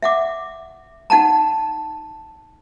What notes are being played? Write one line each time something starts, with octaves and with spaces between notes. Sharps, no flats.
E5 F#5 D6
D#4 F#5 A5 A#5